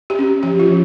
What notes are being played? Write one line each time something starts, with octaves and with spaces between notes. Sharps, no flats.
G4
C#4
F3 G4
F4
F3